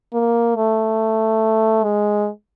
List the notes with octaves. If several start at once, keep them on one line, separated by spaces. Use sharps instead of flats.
A#3
A3
G#3